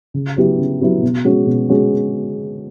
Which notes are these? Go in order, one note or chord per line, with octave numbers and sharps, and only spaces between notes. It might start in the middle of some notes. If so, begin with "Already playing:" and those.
C#3
F#3 B3 E4 G4
C#3
F#3 B3 E4 G4
B2
G#3 C#4 F#4
B2
G#3 C#4 F#4